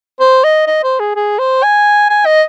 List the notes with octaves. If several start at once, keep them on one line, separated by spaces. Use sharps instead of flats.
C5
D#5
D#5
C5
G#4
G#4
C5
G#5
G#5
D#5